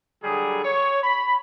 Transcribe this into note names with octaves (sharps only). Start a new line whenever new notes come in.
D3 F#3 G3 G#4
C#5
B5